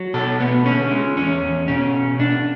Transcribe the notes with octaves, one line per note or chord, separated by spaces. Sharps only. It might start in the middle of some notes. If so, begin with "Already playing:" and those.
Already playing: F#3
B2 A4
A3 B3
D3 C#4
G#3
E2 C#4
E2
B2 C#4
B2
B2 D4